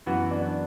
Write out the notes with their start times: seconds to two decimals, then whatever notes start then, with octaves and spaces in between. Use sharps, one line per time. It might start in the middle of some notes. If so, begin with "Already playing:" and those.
0.06 F#2 E3 B3 E4 F#4
0.31 D4